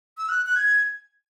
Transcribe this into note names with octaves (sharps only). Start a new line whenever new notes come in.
E6
F#6
F#6
G#6